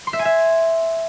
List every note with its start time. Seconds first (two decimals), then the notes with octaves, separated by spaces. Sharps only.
0.07 C6
0.13 E5
0.19 G#5
0.25 E5